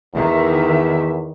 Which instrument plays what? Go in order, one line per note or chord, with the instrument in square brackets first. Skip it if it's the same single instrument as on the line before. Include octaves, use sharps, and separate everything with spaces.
[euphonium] E2 [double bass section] D#3 [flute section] E5